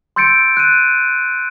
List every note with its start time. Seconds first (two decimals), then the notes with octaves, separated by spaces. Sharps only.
0.16 C6 E6 G6 A6 C#7 D7
0.57 F#6 A6 D#7